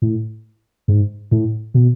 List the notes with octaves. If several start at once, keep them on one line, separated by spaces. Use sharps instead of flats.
A2
G#2
A2
B2